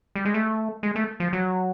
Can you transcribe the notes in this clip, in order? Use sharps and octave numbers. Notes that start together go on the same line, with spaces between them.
G3
G#3
A3
G#3
A3
F3
F#3